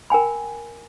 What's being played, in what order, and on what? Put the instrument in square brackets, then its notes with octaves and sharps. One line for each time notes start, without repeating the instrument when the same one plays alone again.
[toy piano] A#4 G5 G#5 B5